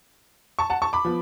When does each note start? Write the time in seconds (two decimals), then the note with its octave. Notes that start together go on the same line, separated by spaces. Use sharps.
0.59 A5 C#6
0.70 F#5 A5
0.82 A5 C#6
0.93 B5 D6
1.05 F3 B3